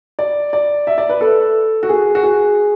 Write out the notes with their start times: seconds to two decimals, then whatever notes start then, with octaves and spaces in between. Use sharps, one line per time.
0.19 D5
0.53 D5
0.87 E5
0.98 D5
1.09 B4
1.21 A4
1.83 F#4
1.89 G#4
2.15 F#4
2.23 G#4